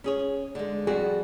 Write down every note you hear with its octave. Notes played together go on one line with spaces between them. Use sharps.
C#4 G#4 C#5
D3 G#3
F2 G3 F#4 G#4